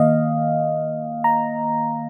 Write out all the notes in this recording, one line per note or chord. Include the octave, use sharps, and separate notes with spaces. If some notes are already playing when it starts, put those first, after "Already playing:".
Already playing: D#3 A#3 D#5 F5
A#5